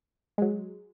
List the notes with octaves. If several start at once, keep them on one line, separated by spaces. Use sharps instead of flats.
G#3
F#3